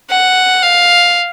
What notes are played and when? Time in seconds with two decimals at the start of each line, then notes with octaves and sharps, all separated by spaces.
0.10 F#5
0.63 F5